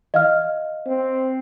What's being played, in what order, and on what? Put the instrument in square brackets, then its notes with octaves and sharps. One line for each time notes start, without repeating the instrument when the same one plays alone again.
[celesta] D#5 F5 F6
[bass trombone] C4